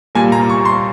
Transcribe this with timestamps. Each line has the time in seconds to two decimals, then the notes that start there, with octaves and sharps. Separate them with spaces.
0.15 A#2 G3 A#3 F4 A#4 G#5
0.32 A#5
0.49 C#6
0.65 C6